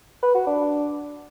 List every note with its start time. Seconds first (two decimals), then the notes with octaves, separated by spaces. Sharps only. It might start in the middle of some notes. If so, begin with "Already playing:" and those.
0.23 B4
0.35 F#4
0.47 D4